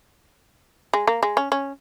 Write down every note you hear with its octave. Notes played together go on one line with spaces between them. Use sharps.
G#3
A#3
G#3
C#4
C#4